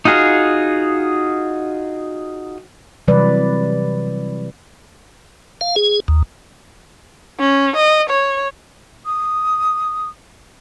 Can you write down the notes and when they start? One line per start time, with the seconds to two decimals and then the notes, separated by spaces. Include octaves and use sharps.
0.05 D#4 F4 F#4 G#4 F5
3.08 C3 E3 F#3 G3 B4 D5
5.61 F5
5.76 G#4
6.08 D#2
7.40 C#4
7.76 D#5
8.10 C#5
9.04 D#6